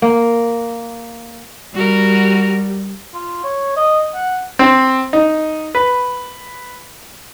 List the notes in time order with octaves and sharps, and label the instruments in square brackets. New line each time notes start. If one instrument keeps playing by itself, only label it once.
[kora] A#3
[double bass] G3 [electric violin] F#4 A#4
[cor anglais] F4
C#5
D#5
F#5
[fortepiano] C4
D#4
B4